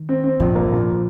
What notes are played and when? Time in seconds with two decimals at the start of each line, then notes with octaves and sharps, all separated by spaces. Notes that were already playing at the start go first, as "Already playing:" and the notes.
Already playing: D#3
0.09 C4
0.24 C4
0.40 A#1 F3
0.55 A#3
0.72 A#2